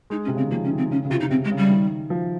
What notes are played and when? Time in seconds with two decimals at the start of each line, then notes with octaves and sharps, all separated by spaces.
0.10 G#3 D#4
0.24 C#4
0.28 C3
0.35 C#3 C4
0.43 D#3
0.50 F3 A#3
0.64 C#4
0.70 D#3
0.77 C4
0.90 C#3 C#4
1.04 C#3
1.10 C3 F4
1.20 D#4
1.30 C3 C4
1.44 G#3
1.51 C#3
1.57 G3
1.70 D#3
2.10 F3